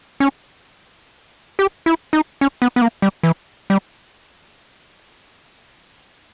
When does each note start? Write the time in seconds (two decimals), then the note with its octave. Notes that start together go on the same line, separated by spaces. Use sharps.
0.20 C#4
1.59 G4
1.86 E4
2.13 D#4
2.41 C#4
2.62 B3
2.76 B3
2.82 A#3
3.02 G3
3.23 E3
3.70 G3